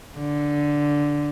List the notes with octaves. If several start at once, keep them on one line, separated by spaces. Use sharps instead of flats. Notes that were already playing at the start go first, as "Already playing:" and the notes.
D3